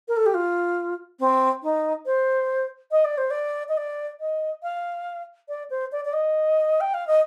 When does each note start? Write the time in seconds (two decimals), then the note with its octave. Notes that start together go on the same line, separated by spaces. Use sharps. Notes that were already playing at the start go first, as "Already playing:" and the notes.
0.08 A#4
0.17 A4
0.26 G4
0.34 F4
1.20 C4
1.63 D#4
2.06 C5
2.91 D#5
3.05 D5
3.18 C5
3.31 D5
3.69 D#5
3.77 D5
4.20 D#5
4.63 F5
5.49 D5
5.70 C5
5.92 D5
6.05 D5
6.13 D#5
6.81 G5
6.94 F5
7.07 D#5